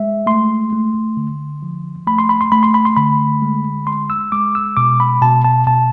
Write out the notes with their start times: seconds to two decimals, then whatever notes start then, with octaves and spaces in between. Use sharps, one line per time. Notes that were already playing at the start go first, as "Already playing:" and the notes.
Already playing: G#3 E5
0.27 A3 C6
0.73 A3
1.17 D3
1.63 F3
2.07 A3 B5
2.18 C6
2.29 B5
2.41 C6
2.52 A3 B5
2.63 C6
2.74 B5
2.85 C6
2.96 D3 B5
3.42 G#3
3.87 G#3 C6
4.10 E6
4.32 G#3 D6
4.55 E6
4.77 B2 D6
5.00 B5
5.22 B2 A5
5.44 A5
5.67 B2 A5